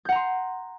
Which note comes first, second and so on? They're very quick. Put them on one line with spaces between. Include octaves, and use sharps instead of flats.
G6 F#5 A#5 C6